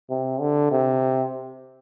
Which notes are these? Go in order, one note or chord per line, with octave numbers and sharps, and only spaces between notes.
C3
D3
C3